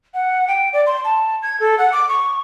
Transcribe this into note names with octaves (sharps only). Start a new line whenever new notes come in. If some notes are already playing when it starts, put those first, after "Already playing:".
F#5
G5
D5
C6
A5
G#6
A4
F#5
D6
C#6